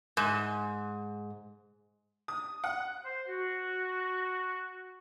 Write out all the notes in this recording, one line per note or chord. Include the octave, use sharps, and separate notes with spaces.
G#2
D#6
F#5
C5
F#4